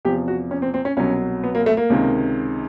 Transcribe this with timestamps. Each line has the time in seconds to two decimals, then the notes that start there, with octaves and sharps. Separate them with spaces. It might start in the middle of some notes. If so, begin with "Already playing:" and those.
0.05 E2 C3 F3 G4
0.28 F#4
0.51 C#4
0.62 C4
0.74 C4
0.85 C#4
0.97 C2 B2 F#3 C#4
1.44 B3
1.55 A#3
1.66 A3
1.77 A#3
1.90 C#2 C3 D#3